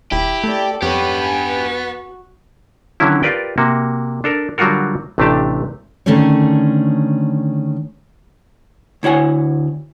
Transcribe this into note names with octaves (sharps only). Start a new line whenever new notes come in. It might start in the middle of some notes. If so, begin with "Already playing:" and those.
D#1 E4 G4
A3 A4 D5
F2 B3 G4 B4 C#5
G#5
F#4
D3 D#3 F#3 C#4 E4
F4 G4 A#4 B4 D5 G5
C3 A#3 F#4
D4 A4 A#4
D3 F#3 G3 F4 F#4 A#4
A1 C3 A3 D4 G4 A5
D3 D#3 A3 C#4 G#4 C#5
D2 E4 C#5 F#5 G#5